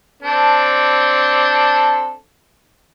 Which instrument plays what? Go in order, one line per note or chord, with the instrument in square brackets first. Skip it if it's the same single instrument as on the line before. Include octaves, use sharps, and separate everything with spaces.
[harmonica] C4 D4 A4